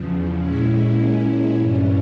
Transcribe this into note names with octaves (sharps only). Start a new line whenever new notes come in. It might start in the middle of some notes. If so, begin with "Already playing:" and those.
Already playing: E2 C#3 F3
A#2 G#3 C#4 E4
G2 E3 G3 C#4